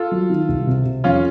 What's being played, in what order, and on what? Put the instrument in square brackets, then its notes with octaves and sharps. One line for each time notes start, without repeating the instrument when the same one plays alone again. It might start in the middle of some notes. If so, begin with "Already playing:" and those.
Already playing: [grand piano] F4 A4
[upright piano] F#3
D#3
C2
C3
C3
[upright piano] F2 [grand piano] C#4 F4